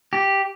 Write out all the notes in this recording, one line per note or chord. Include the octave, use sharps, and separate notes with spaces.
G4